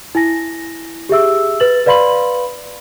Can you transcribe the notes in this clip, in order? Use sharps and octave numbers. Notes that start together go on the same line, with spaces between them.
E4 G#5 A#6
G4 G#4 E5 E6
B4 A6 F#7
B4 D5 F5 B5 C6 F#7